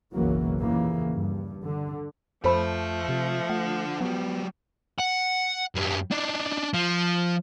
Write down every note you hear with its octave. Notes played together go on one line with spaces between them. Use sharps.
F#1 B1 C#3 E3 F#3 A#3
D#2 A#2 C#3 E3 A#3
G2
D3
F2 F3 A4 C5 E5 A5 B5
C3
D3 A3 F#5
F#3 B3 G4
F#5
F#2 G3
D4 D#4
F3